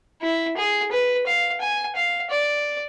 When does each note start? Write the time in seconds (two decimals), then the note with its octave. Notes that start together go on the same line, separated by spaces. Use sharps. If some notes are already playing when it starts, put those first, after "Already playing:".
0.22 E4
0.57 G#4
0.92 B4
1.26 F5
1.61 G#5
1.96 F5
2.30 D5